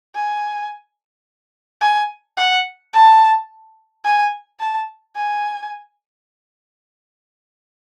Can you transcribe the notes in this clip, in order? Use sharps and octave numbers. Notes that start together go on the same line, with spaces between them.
G#5
G#5
F#5
A5
G#5
A5
G#5